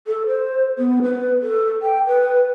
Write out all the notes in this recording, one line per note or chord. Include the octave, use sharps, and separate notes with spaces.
A4
C5
B3
B4
A4
G5
B4